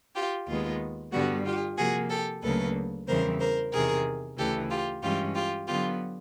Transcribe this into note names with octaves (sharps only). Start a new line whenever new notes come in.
F4 G4
D#2 D#3 G#3 B3 F4
G2 D3 G3 B3 F#4
F4 G4
C3 F3 A#3 F#4 G#4
G4 A4
D2 C#3 F#3 A#3 A4 B4
E2 C#3 E3 G3 C4 A#4 C5
A#4 C5
E2 C3 D#3 G#4 A#4
D2 C#3 E3 G4 A4
F4 G4
G2 E3 G#3 C#4 F4 G4
F4 G4
D3 F#3 B3 F4 G4